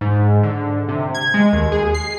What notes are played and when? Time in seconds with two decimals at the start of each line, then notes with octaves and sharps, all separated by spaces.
0.01 G#2
0.43 D3
0.89 C3
1.15 G#6
1.34 G#3
1.53 D#2
1.72 G#4
1.94 C7